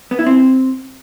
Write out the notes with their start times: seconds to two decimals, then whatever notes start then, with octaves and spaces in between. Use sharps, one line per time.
0.11 B3
0.19 E4
0.26 C4